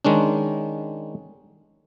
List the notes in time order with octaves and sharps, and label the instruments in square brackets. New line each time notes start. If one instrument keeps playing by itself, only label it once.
[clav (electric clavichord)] D#3 G#3 C#4 D4